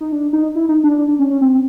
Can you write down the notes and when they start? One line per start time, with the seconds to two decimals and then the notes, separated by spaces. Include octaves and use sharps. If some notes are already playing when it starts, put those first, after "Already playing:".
0.01 D#4
0.12 D4
0.33 D#4
0.55 E4
0.69 D#4
0.84 D4
0.98 D4
1.09 D4
1.19 C#4
1.30 C#4
1.41 C4